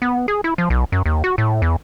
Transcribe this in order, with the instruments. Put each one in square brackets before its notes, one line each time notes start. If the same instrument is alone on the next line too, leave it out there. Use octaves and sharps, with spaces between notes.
[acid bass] B3
G#4
E4
F3
B1
F#2
D#2
F#4
A2
E2